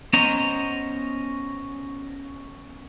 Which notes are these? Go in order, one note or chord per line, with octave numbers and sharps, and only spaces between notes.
B3 C#4 C5 C#5 D#5 A#5